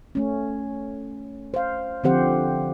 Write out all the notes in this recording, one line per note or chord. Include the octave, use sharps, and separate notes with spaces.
A3 C#4
C5 F5
D3 F3 C4 G4 C5 F#5